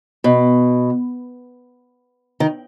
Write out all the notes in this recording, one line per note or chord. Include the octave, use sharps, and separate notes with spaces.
B2
D#3